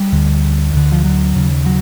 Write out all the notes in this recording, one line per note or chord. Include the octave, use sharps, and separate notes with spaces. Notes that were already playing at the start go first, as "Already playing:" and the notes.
Already playing: G3
D2 D3
D2 D3
F3
F#3
D#2 C#3
F#3